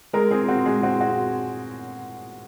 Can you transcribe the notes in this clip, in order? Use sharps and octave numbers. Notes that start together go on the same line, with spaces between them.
G#3 A#4
C4 G#4
C4 F#4
G#3 G#4
C4 F#4
F#4